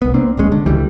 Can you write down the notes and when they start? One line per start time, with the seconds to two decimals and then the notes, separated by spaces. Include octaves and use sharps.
0.02 C2 B3
0.14 A#3 C4 D4
0.37 D1 A#1 G#3 C#4
0.52 D3
0.66 C#2 E3 G3 A3